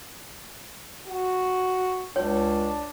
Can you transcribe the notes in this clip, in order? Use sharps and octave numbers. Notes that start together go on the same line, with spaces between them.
F#4
C#2 D4 C#5